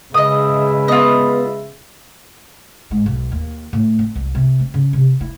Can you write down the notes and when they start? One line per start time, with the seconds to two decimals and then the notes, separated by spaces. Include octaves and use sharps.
0.14 C#3 G#3 B4 D#5 E5 D#6
0.88 B3 F4 D#5
2.91 G#2
3.06 B1
3.32 D#2
3.73 A2
3.99 C4
4.16 C2
4.35 C3
4.60 C4
4.74 C#3
4.93 C3
5.21 E4